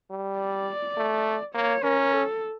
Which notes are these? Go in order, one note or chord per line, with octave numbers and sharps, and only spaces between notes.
G3
D5
A3
A#3 C#5
C#4 A#4
A4